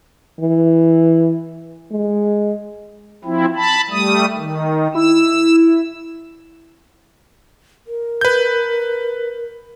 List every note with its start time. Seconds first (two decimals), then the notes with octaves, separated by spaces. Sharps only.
0.40 E3
1.92 G#3
3.25 F3 C4 E4
3.56 A5 B5
3.90 G3 A3 D#6
4.36 D#3
4.95 E4 E6
7.87 A#4
8.21 B4 G6